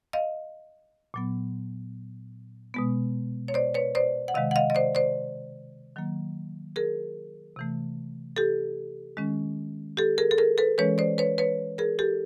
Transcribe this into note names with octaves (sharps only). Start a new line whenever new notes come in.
D#5 F5
A#2 F#3 B3
B2 G#3 B3
C#5
C5 D5
B4 C#5
C5 D5
F#5
C3 D#3 G#3 D#5 F5
F#5
D#5 F5
D#5
C5 D5
C5 D5
D#3 F#3 A#3
G#4 A#4
C3 E3 A3
G4 A4
D#3 G#3 C#4
G4 A4
G#4 A#4
A4
G#4 A#4
A4 B4
E3 G#3 C#4 B4 C#5
C5 D5
B4 C#5
B4 C#5
G#4 A#4
G4 A4